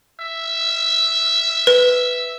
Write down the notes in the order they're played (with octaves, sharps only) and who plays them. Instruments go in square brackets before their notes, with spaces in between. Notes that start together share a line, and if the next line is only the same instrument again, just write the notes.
[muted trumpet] E5
[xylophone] B4